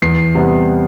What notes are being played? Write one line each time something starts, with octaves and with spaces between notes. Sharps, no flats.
E2 C7
C3 G3 B3